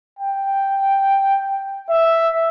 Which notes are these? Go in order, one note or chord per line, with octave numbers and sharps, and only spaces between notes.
G5
E5